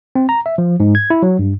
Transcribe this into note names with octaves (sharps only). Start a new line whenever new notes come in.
C4
A#5
E5
F3
G#2
G#6
E4
F#3
G2